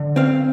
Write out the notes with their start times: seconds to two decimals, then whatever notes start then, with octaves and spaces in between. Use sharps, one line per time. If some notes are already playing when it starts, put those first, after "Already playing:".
Already playing: D3
0.16 C4 F5